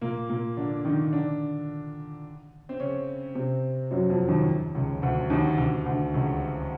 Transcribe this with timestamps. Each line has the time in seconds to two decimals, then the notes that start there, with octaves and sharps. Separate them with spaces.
0.01 A#2 A#3
0.29 A#2 A#3
0.57 D3 D4
0.85 D#3 D#4
1.13 D3 D4
2.69 C4
2.80 C#3 C#4
3.35 C3 C4
3.91 F#2 F#3
4.10 F2 F3
4.28 D#2 D#3
4.75 C#2 C#3
5.02 D2 D3
5.30 D#2 D#3
5.58 D2 D3
5.86 D2 D3
6.14 C#2 C#3